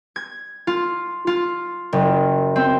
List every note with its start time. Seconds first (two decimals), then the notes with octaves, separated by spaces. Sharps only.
0.16 G#6
0.67 F4
1.27 F4
1.93 F#1
2.56 C4